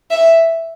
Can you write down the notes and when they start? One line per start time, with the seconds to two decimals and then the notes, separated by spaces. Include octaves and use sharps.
0.11 E5